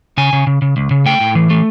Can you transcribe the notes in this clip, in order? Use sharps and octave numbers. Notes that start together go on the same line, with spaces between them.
C#3 G#5
C#3
C#3
C#3
C#2
C#3
A3 G5
A2
E3
A3